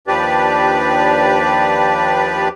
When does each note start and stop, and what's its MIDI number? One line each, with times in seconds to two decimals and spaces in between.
0.07 2.49 39
0.07 2.49 53
0.07 2.49 62
0.07 2.49 67
0.07 2.49 71
0.07 2.49 74